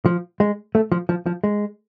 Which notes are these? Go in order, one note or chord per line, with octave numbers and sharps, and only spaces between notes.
F3
G#3
A3
F3
F3
F3
G#3